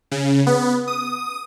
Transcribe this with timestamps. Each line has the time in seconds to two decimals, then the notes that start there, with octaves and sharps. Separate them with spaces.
0.11 C#3
0.47 B3
0.87 D#6